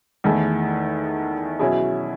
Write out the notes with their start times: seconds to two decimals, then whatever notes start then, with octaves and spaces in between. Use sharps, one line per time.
0.24 E2 D#3 A3 E4 G#4
1.59 B2 F#3 C#4 E4 G#4